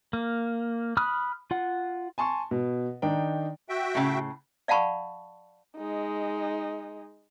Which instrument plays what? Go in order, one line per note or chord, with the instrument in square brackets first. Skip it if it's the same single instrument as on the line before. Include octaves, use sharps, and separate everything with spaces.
[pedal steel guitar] A#3
B5 D#6 F6 F#6
F4 F#5
[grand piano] G#5 A5 C6 C#6
B2
D#3 D4 D#4 G5
[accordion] F#4 E5 G5
[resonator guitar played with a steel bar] A2 C#3
[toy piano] D5 F5 F#5 A5 B5 C#6
[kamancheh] G#3 D#4